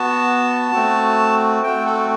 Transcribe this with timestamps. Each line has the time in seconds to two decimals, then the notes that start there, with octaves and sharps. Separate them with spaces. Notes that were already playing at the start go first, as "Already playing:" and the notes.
Already playing: B3 F#4 A5
0.72 A3 C4 F#4
1.63 A3 C4 F#4 G5
1.86 A4